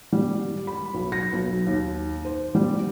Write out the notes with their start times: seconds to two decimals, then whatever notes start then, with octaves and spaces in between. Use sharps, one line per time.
0.13 G3
0.67 B5
0.94 B1
1.12 A#6
1.33 B1
1.66 D#2
2.25 C5
2.55 G3